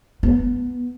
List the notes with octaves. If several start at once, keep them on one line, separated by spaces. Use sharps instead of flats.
B3